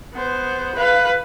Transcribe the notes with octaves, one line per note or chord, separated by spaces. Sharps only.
B3 C5
B4 F5